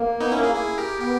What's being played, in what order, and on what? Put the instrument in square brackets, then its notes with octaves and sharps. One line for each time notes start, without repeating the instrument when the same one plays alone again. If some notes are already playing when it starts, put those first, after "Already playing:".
Already playing: [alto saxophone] A#3
[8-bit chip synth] B3 D#4
C#4 E4
E4 G#4
E4 G#4
G4 A#4
[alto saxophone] B3 [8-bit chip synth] G4 A#4